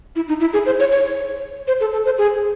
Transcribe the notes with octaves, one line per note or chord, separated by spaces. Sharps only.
E4
D#4
E4
G#4
C5
C#5
C#5
C5
A4
A4
C5
G#4